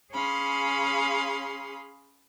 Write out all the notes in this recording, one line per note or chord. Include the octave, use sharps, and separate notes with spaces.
C#4 G#4 F5 B5 C6